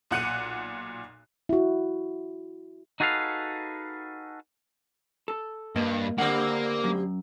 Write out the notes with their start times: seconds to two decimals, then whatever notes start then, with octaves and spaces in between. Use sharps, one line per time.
0.11 B1 A#2 F#5 F#6 C#7 D#7
1.49 E4 F#4
3.00 D#4 F#4 G#4 A4 B4 F5
5.28 A4
5.76 G2 A#3 D#5
6.18 D3 G3 A#3 C4 F#5
6.84 F#2